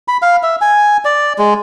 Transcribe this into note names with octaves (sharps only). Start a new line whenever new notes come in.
B5
F5
E5
G#5
D5
G#3